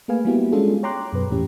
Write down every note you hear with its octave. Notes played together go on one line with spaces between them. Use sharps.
A3 A#3 G#4 B4 F5 G#5
G3 A#3 B3 E4 F#4 G4
G#3 C#4 D4 F4 G#4 A4
C#5 G5 A#5 C6 D6 F#6
F#2 B2 B4
E2 A2 E3 C#4 G4